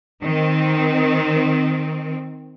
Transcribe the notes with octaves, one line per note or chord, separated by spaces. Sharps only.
D#3 C4